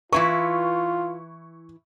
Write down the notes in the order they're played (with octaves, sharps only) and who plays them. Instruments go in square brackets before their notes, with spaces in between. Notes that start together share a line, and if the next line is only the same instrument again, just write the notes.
[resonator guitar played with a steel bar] E3 E4 B4 [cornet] F4 [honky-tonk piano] C#6